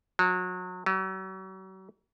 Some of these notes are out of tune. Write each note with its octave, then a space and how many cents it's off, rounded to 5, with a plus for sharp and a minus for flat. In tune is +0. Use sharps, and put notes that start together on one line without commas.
F#3 -30
F#3 +40